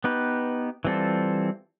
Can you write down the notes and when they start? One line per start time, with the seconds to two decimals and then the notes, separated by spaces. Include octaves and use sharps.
0.04 B3 D#4 G4 B4
0.85 E3 G3 C4 F4 A4